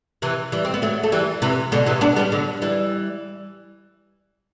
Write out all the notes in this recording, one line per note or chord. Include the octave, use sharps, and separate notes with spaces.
C3 E3
E3 G3
C4
B3
F#3 A3
A3
E3 G3
C3 E3
B2 D3
C3 E3
B3 D4
G3 B3
D3 F#3
E3 G3